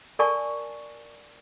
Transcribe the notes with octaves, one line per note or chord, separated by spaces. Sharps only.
A#4 D5 G#5 A5 C#6